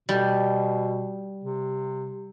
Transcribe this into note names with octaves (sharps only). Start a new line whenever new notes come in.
B2 G3
C3